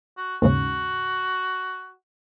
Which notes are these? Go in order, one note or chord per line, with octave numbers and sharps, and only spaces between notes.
F#4
D#2 G#2 C#3 F#4